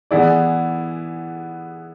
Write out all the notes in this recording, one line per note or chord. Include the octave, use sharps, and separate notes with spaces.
E3 B3 E4 G#4 D5